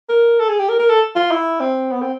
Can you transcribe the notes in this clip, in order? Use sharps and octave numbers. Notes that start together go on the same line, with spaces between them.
A#4
A4
G#4
G4
A#4
A#4
A4
F4
E4
C4
B3
C4